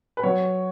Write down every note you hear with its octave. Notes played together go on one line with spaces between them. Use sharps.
B4
F#3 C#5